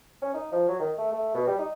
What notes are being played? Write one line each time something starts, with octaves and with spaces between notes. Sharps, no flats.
C#4
D#4
F3
F#3
D#3
A3
A3
B2
G3
D#4